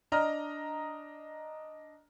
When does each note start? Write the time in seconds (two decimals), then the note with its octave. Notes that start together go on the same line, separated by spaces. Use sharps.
0.12 D4 D#5 A#5 F6